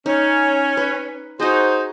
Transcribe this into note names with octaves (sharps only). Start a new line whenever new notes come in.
C#4 D#4
B4
D#4 F#4 G#4 C5